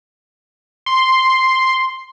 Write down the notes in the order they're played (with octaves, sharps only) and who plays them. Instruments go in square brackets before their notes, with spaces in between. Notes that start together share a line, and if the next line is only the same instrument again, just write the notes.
[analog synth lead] C6